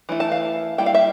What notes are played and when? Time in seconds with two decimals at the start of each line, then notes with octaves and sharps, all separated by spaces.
0.09 E3 A3 E4
0.20 A5
0.32 F5
0.78 G3 A#3 E4 G5
0.86 F5
0.95 E5